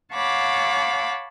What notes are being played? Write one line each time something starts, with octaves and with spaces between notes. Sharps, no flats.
C#5 F5 F#5 A5 B5 D6